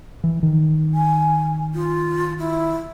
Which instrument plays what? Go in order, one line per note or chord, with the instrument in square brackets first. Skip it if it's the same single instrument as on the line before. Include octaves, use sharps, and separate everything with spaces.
[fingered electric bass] E3
D#3
[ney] G#5
F4
E4